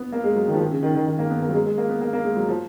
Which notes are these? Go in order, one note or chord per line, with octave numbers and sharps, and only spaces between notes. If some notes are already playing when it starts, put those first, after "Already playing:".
Already playing: B3
A#3
G#3
F#3
D#3
F3
D#3
C#3
D#3
D#3
D#3
A#3
B3
A#3
F#3
G#3
G#3
A#3
B3
A#3
A#3
G#3
F#3
F3